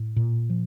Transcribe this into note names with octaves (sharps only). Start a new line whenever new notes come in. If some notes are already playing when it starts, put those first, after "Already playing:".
Already playing: A2
A#2
F3